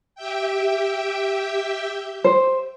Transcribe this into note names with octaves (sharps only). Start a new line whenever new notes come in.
G4 E5 G5
C5